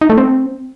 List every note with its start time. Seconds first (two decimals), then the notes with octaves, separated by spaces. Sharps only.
0.01 D#4
0.10 A3
0.18 C4